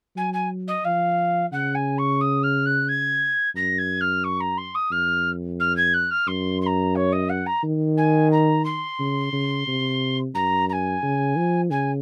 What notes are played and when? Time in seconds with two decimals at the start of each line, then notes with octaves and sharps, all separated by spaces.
0.16 F#3 G#5
0.33 G#5
0.67 D#5
0.84 F3 F5
1.52 C#3 F#5
1.74 G#5
1.98 C#6
2.21 D#6
2.43 F6
2.65 F#6
2.88 G#6
3.55 F#2 A#6
3.78 G#6
4.00 F6
4.24 C#6
4.40 A#5
4.57 C6
4.74 D#6
4.91 F2 F6
5.59 F6
5.76 G#6
5.93 F#6
6.10 F6
6.27 F#2 C6
6.61 C6
6.66 A#5
6.95 C#5
7.12 D#5
7.29 F#5
7.46 A#5
7.63 D#3
7.97 G#5
8.32 A#5
8.64 C6
8.99 C#3
9.33 C#3
9.67 C3
10.34 F#2 A#5
10.69 A#5
10.72 G#5
11.03 C#3
11.36 F3
11.70 C#3 G#5